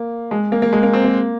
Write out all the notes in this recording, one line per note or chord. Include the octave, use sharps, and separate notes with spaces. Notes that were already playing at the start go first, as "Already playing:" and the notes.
Already playing: A#3
G#3
A#3
A#3
G#3
A#3
C4
A#3